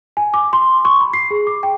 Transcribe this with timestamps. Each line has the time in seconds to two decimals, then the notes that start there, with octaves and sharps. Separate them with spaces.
0.17 G#5
0.34 D6
0.53 C6
0.85 C#6
1.01 B5
1.13 C7
1.31 G#4
1.47 D6
1.63 G5